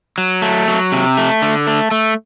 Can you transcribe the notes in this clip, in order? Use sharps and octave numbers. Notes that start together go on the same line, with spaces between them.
F#3
A3
F#3
C3
A3
D3
A3
A3